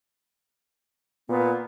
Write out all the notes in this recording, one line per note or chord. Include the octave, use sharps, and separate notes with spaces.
A#2 B3